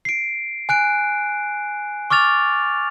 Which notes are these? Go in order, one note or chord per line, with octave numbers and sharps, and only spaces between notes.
C7 D7
G#5 F#6 D7
C#6 D6 F6 A6 F7